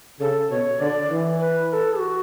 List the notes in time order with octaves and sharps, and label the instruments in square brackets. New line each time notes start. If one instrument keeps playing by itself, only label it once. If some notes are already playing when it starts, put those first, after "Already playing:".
[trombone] C#3 [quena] A4
[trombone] B2 [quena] C#5
[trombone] D3 [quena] D5
[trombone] E3
[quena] B4
B4
A4
F#4